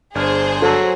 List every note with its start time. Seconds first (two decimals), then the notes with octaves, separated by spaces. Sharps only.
0.15 G1 D4 G#4 C5 F6
0.62 F#3 A4